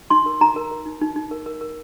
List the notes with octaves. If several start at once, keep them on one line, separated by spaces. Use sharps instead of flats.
D#4 C6
A#4
D#4 A#5
A#4
A#4
D#4
D#4
D#4
A#4
A#4
A#4